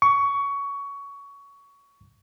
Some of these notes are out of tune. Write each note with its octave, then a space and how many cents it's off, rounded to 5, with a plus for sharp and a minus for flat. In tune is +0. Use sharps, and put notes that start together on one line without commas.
C#6 +20